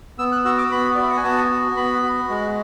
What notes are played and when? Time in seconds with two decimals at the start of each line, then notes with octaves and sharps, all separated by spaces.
0.18 B3 E6
0.32 F#6
0.45 F#4 E6
0.58 D6
0.71 B3 B5
0.95 F#4 D5
1.03 E5
1.10 F#5
1.17 G#5
1.24 B3 A5
1.51 F#4
1.77 B3 B5
2.03 F#4
2.29 G#3